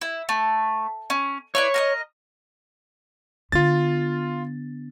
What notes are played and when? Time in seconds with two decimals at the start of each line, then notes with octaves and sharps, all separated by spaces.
0.01 E4
0.29 A3
1.10 C#4
1.55 E4 B4 C#5 D5
1.74 A#4 B4 D#5
3.52 D3 B3 F4 A6